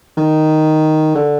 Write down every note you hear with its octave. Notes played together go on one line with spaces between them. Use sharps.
D#3
D3